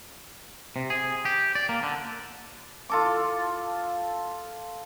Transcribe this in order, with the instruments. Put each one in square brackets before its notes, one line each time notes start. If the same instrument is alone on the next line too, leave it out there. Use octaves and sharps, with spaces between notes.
[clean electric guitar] C3
G#4
G4
D5
A#3
D3
[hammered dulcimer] F4 A4 D6